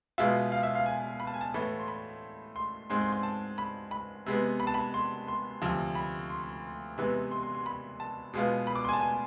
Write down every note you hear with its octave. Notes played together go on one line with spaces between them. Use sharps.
B2 G#3 B3 F4 E5
F5
E5
F5
G#5
B5
A5
G#5
A5
A2 E3 A3 B5
C6
B5
C6
G#2 G#3 C4 C6
C6
C6
A5
B5
B5
C3 G#3 B3
B5
A5
B5
C6
C6
D2 C3 F3
B5
C6
C3 E3 G#3 B3
C6
C6
C6
B5
A5
B2 G#3 B3 F4
B5
D6
C6
G#5
A5
G#5